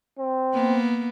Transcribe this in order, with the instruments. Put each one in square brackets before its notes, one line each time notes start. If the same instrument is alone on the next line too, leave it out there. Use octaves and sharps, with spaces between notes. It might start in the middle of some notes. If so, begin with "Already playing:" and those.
[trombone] C4
[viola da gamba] A#3 B3